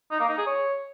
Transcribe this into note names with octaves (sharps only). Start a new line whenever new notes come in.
D#4
A#3
D#4
G#4
C#5